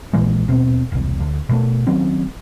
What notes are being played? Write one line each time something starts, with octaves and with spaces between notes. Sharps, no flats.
A#1 A#2 E3 G#3
D#1 B2 C4
E1 C2
D2
B2 F#3 A3
D#3 F#3 C4 C#4